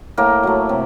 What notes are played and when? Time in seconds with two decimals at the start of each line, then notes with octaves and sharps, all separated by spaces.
0.17 A2 A#3
0.43 F#3 A3
0.69 C3